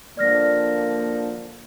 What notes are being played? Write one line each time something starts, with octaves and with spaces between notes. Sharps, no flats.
D3 F3 A#3 D5 F6 A#6